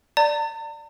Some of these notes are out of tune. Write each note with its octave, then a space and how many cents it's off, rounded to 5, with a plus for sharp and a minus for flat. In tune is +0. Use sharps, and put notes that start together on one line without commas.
D5 +0 A#5 -45